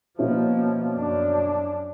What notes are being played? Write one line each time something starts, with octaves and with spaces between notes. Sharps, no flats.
B2 F3 A#3 C#4 E4
F#2 D4